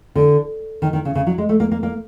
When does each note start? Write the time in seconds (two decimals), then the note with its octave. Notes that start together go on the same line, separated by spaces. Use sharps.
0.16 D3
0.82 D#3
0.93 D#3
1.05 C#3
1.15 C#3
1.27 F#3
1.38 G#3
1.49 A3
1.60 A#3
1.71 A#3
1.83 A#3